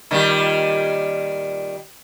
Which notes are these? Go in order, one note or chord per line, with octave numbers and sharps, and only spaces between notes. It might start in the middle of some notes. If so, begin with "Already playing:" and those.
A#2 D#3 G3